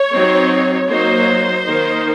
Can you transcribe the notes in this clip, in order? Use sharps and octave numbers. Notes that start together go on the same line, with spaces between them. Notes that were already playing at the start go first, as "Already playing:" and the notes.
Already playing: C#5
F#3 C4 D#4
F#3 A#3 D#4 C5
D#3 A#3 D#4